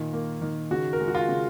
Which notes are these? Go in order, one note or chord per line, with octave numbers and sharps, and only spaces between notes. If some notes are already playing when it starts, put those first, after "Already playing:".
Already playing: A#2 D#3
A#3
D#3
C#3 F#4
A#4
G#3
F#4
F4
C#3